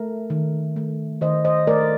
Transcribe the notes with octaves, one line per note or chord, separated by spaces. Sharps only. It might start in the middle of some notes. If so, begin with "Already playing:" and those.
Already playing: A3 A#4
D#3
A3
D#3 C5 D#5
C5 D#5
A3 A#4 D5